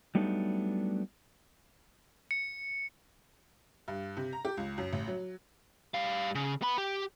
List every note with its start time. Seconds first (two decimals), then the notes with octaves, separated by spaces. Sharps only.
0.15 F#3 G3 A3 B3 D4 D#4
2.31 C#7
3.88 G2
4.17 C3
4.33 A#5
4.45 G4
4.57 C#2
4.78 F#2
4.93 A1
5.08 F#3
5.94 G3 F5
6.35 C#3
6.62 B3 B5
6.78 G4